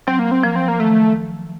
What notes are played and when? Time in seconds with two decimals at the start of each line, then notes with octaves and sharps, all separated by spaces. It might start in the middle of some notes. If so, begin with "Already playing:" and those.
0.07 F#3 C4
0.19 A#3
0.31 C4
0.43 F3 A#3
0.55 C4
0.68 A#3
0.80 D#3 A3